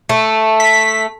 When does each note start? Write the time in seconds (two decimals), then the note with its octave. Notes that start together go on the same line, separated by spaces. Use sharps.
0.09 A3
0.60 B6